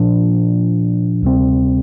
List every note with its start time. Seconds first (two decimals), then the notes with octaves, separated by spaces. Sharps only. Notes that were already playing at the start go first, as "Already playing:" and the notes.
Already playing: A#2 F3 D4
1.22 D2 C3 G3 C4